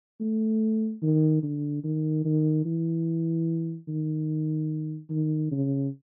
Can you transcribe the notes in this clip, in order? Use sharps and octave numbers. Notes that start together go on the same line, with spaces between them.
A3
D#3
D3
D#3
D#3
E3
D#3
D#3
C#3